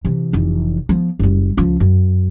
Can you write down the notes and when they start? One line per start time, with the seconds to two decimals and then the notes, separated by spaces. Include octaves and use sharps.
0.05 C3 E3
0.33 F1 E3
0.89 F3 B3
1.19 F#1 G3
1.57 C#2 F3
1.80 F#2